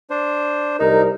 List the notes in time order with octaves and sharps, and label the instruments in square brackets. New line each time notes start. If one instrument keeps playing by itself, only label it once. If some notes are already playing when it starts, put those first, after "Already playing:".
[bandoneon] D4 C5
[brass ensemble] C2 A#4 [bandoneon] D#4